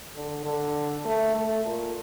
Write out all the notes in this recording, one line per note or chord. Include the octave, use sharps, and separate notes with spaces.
D3
D3
A3
A3
A#2